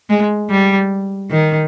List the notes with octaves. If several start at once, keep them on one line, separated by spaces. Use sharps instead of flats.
G#3
G3
D#3